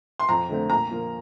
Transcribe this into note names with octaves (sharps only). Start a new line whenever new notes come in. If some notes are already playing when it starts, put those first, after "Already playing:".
C6
F2 A#5
D3 A3 C4
A#2 A#5
F3 A#3